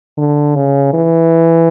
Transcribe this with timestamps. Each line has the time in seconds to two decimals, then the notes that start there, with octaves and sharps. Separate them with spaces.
0.18 D3
0.56 C#3
0.94 E3